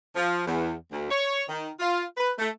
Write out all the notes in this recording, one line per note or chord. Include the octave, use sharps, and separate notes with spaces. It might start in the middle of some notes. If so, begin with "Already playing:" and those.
F3
E2
D2
C#5
D#3
F4
B4
A3